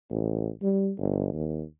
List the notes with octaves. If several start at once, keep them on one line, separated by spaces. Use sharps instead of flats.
A1
G3
G1
D#2